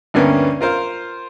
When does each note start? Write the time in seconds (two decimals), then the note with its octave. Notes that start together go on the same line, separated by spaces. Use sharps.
0.14 D2 G2 A#3 B3 C#4
0.61 F4 A#4 C5 F5